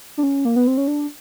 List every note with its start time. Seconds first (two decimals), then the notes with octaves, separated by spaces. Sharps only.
0.18 D4
0.23 C#4
0.45 A#3
0.56 B3
0.67 C4
0.77 C#4
0.87 D4